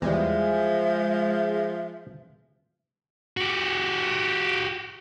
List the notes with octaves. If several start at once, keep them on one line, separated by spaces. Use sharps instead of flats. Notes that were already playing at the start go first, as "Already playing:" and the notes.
E2 F3 G3 G#3 E5
F#4 G4